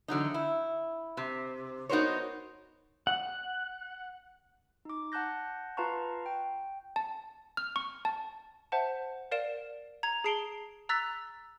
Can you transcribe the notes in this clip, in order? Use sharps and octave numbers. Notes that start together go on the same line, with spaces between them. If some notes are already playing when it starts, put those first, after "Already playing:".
E2 D3 F#3 D#4
E4
C3
B3 D#4 F#4 A#4 C5 C#5
F#5
D#4 D6
F#5 A5 F#6 G6 A#6
F4 B4 F5 A5 A#5 C#6
G5
A5
F6
C#6
A5
C5 E5 F#5 A5
A#4 D5 F5 D7 E7
A#5 G#6 F7
G#4 A5 C7 D7 F7 G7
A#5 E6 F#6 A6 B6